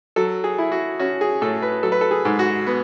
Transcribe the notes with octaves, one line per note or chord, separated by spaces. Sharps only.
F#3 A4
G#4
E4
F#4
C#4 F#4
G#4
A2 A4
B4
F#3 A4
B4
A4
G#4
G#2
F#4
B3